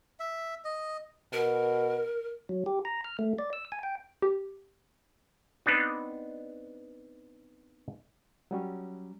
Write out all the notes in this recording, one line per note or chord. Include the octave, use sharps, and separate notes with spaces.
E5
D#5
B2 A#4
F#3
G4
A#5
F6
A3
D5
E6
G#5
G5
G4
B3 C4 D4 D#4
F#3 G3 C#4